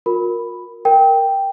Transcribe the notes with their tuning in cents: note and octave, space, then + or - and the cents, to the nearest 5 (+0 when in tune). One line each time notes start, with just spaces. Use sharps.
F4 +45 A#4 +0 B5 +0
A#4 +0 G5 +0